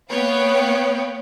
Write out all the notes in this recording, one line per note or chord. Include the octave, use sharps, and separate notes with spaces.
A#3 B3 B4 C#5 F5 G5